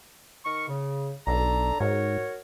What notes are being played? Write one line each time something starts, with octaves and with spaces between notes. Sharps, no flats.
D#3 A#4 C#6
C#3
B1 D4 A4 A#5
G#2 F#4 A#4 C#5